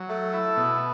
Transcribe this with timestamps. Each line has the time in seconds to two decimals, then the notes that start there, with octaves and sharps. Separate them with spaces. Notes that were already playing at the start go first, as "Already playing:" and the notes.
Already playing: F#3
0.09 A3 A4
0.33 E4
0.57 B2